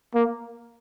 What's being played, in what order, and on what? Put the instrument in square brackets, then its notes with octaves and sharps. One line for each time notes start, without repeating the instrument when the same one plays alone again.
[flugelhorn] A#3